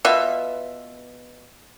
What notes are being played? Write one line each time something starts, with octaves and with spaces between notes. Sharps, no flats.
B2 B3 F4 E5